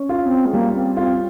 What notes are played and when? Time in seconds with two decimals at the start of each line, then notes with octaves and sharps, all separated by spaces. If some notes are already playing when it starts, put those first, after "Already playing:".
Already playing: C#4
0.09 F4
0.24 C4
0.45 G#3
0.53 G3 A#3
0.75 C4
0.97 C4 F4